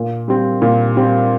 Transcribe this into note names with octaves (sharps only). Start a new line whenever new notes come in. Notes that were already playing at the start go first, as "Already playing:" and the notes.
Already playing: A#2
G3 C4
A#2
G3 C4